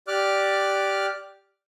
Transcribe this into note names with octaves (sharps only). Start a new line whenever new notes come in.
G4 D5 D6 F6 F#6